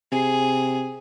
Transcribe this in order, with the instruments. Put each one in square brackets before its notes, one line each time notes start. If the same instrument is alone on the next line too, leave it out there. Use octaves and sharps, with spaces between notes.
[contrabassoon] C3 [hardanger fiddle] G#4